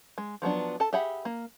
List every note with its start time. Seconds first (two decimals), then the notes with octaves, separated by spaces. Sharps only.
0.18 G#3
0.42 F3 F#3 B3 D4
0.80 A4 A5
0.93 G4 G#4 E5 F#5 B5
1.25 A#3